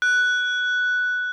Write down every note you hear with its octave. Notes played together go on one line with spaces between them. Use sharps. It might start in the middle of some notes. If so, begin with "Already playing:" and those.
F#6